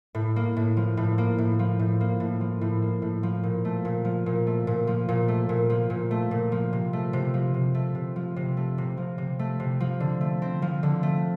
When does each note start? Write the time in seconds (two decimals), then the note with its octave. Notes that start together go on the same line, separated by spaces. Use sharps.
0.15 A2
0.36 A#3
0.57 A2
0.77 F3
0.97 A2
1.18 A#3
1.38 A2
1.59 F3
1.79 A2
2.01 A#3
2.20 A2
2.41 F3
2.61 A2
2.82 A#3
3.02 A2
3.23 F3
3.43 A#2
3.65 A3
3.85 A#2
4.05 F3
4.26 A#2
4.47 A3
4.67 A#2
4.87 F3
5.09 A#2
5.28 A3
5.49 A#2
5.70 F3
5.90 A#2
6.11 A3
6.31 A#2
6.52 F3
6.73 C3
6.93 A3
7.13 C3
7.34 F3
7.54 C3
7.75 A3
7.95 C3
8.16 F3
8.36 C3
8.57 A3
8.78 C3
8.97 F3
9.18 C3
9.39 A3
9.60 C3
9.80 F3
10.00 D3
10.21 A3
10.42 C4
10.62 F3
10.83 D3
11.03 A3